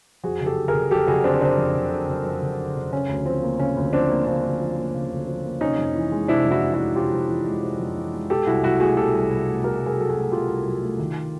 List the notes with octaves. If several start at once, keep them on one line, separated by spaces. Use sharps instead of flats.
F2 F#4 G#4
F#1
G4 A4
D3
G#4 A#4
F#1
F2 G4 A4
F#1 F#4 G#4
D3 C4 D4
F#1 C4 D4
F2
F#1
D3
F#1
F2
F#1
D3
F#1
C#3 C#4
D2
F3 C4
A#3
C#3 C#4
D2
F3 C4 D4
A#3
C#3 C4 D4
D2
F3
A#3
C#3
D2
F3
A#3
C3 C#4 D#4
F2
E3
G#3
C3 D4 E4
F2
E4 F#4
E3
E4 F#4
G#3
C3 F4 G4
F2
E3
G#3
C3
F2
E3
G#3
B2 G4 A4
C2 E4 F#4
F#3 E4 F#4
A3 F#4 G#4
B2 G4 A4
C2
F#3
A3
B2 G#4 A#4
C2
G#4 A#4
F#3 A4
F#4 G#4
A3
B2 F4 G4
C2
F#3
A3
D#3